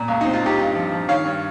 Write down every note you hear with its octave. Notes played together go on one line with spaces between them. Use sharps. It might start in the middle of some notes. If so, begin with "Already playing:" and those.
Already playing: A#2
C#2
D#4
C4
F4
C4 D#4 G4
G2
F3
F3
D#3 C#5 F5
G2